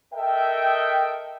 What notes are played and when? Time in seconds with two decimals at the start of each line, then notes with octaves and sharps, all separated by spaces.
0.14 A4 A#4 D#5 E5 G5